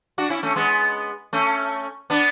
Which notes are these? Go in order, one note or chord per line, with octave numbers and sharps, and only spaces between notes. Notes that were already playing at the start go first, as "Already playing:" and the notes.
D4 F#4
C#4 E4
A3 C#4
G#3 B3
A3 C#4
B3 D4